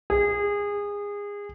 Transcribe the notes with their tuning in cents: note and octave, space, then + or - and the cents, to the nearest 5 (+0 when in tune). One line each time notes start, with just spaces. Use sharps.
G#4 -25